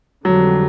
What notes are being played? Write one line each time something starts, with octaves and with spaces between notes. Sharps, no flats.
F2 D3 F#3 G3